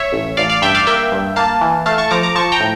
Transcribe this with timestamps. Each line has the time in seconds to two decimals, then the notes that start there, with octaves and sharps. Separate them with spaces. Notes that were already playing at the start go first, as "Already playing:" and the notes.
Already playing: C#5 E5
0.12 A1
0.37 A1 D5 F5
0.50 D5 F5
0.62 G2 E5 G5
0.74 D5 F5
0.87 A#3 E5 G5
1.12 G2
1.36 A#3 F5 A5
1.61 E3
1.86 A3 F5 A5
1.98 A5 C#6
2.11 F3 A#5 D6
2.23 A#5 D6
2.35 F3 A5 C#6
2.52 G5 A#5
2.60 A2